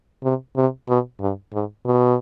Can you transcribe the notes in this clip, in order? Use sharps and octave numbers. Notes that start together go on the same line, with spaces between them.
C3
C3
B2
G2
G#2
B2